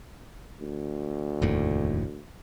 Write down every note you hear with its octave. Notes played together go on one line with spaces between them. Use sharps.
D2
F1 D#2 A2